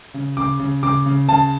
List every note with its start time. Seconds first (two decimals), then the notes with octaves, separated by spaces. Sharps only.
0.14 C#3
0.37 C#3 D6
0.60 C#3
0.83 C#3 D6
1.06 C#3
1.29 C#3 A5